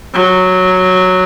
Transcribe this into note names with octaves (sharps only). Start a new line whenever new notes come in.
F#3